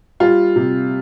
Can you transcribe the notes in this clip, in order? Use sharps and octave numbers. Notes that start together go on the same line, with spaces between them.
G3 F4
C3